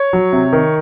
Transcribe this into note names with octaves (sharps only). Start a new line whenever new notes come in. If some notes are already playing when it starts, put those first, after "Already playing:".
Already playing: C#5
F#3
C3
D#3